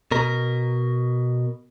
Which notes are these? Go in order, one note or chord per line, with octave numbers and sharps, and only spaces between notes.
B2 A#4